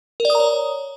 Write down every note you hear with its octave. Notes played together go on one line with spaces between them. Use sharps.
A#4
D5
D#6
A#5
C#5